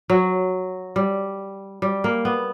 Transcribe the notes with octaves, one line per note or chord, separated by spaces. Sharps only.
F#3
G3
G3
A#3
B3